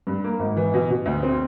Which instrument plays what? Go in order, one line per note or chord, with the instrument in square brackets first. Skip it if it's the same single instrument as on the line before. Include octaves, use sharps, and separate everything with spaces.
[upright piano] G2
A#3
G#1
E3
B2
B2
D2
C4